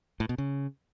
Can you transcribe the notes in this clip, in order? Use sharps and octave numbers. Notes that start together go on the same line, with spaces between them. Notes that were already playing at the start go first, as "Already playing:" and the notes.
A2
B2
C#3